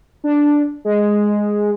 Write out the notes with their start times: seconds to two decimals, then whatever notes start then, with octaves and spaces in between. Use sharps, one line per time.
0.24 D4
0.85 G#3